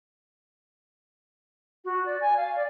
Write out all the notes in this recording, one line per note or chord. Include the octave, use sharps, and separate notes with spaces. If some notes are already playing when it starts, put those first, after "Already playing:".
F#4
D5
G#5
F5
D5